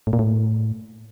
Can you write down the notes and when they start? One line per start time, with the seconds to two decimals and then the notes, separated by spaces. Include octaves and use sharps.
0.07 A2
0.13 A#2
0.19 A2